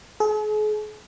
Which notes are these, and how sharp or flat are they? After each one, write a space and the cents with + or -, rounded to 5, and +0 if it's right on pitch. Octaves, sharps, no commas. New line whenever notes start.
G#4 +45